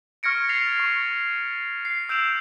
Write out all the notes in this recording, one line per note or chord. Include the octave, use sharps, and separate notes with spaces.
C#6 F6 G#6 A#6 C#7 D7
A6 C7 F7
C#6
C7
E6 G6 D7 E7 F7